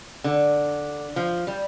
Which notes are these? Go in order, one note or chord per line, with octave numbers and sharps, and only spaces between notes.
D3
F3
G3